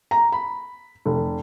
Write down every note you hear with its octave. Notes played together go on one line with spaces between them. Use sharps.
A#5
B5
F1